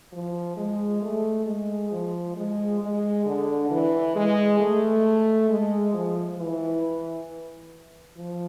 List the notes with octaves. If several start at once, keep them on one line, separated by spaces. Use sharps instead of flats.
F3
G#3
A3
G#3
F3
G#3
G#3
D3
E3
G#3
A3
G#3
F3
E3
F3